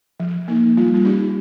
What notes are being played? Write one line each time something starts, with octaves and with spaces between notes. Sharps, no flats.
F3
A#3 D#4
G3 F4
F4
C#4 D#4 G4